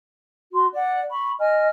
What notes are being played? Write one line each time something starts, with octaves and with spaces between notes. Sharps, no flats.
F#4 C6
D5 F#5
B5 C#6
D#5 G#5 F6